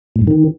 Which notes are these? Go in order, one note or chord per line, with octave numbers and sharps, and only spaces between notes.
A2
G2
D#3